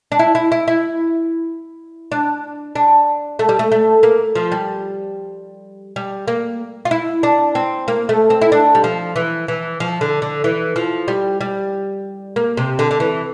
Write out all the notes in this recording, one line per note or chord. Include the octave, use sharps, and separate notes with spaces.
D4
E4
E4
E4
E4
D4
D4
A3
G3
A3
A3
A#3
F3
G3
G3
A#3
F4
E4
D4
C4
A#3
A3
C4
E4
D4
G3
F3
E3
E3
F3
D3
D3
E3
F3
G3
G3
A#3
C3
D3
D3
E3